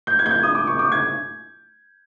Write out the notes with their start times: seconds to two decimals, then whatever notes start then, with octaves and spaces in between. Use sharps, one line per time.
0.07 G6
0.19 G#6
0.26 G6
0.31 G#6
0.43 D#6
0.55 D6
0.67 C#6
0.79 D6
0.92 G#6